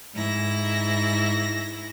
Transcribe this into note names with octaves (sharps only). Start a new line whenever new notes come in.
G#2 E4 A#6